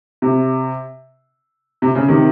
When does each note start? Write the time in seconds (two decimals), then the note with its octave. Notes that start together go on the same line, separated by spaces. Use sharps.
0.22 C3
1.82 C3
1.95 C#3
2.08 C3 D#3